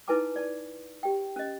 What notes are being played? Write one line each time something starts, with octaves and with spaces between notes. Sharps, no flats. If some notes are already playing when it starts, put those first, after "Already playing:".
D#4 E4 B4 G#5 A5 D6
D5 A5
G4 G5
C#4 D#5